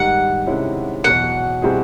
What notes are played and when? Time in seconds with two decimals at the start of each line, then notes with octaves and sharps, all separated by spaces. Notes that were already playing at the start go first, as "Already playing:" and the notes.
Already playing: G#2 D#3 G3 F#5
0.46 C3 D#3 G#3 C#4 E4
1.04 E2 B2 F#3 F#5
1.62 B2 G3 C4 E4 G#4